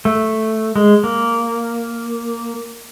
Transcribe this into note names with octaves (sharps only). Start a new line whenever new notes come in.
A3
G#3
A#3